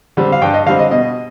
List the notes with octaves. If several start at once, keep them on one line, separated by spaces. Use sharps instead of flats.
D3 G3 C4
F5
G2 G5
D#5
D3 G3 C4 F5
D#5
B2 D#5